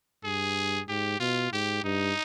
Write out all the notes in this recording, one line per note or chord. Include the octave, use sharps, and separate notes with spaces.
G2 G#4
G#2 G4
B2 F4
G#2 G4
G2 D#4